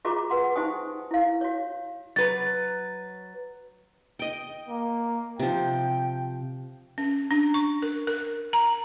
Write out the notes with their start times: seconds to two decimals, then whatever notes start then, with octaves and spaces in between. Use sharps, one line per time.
0.05 F4 F#4 G#4 A#5 B5 D6
0.30 B4 F#5 C6
0.56 D#4 G4 C5 G5 G#5 D#6
1.11 E4 F5
1.41 F#4 C#5
2.16 F#3 B4 A6
4.19 D#5 G5
4.68 A#3
5.39 C3 F3 G5
6.98 C#4
7.31 D4
7.54 C#6
7.82 A#4
8.07 A#4
8.53 A#5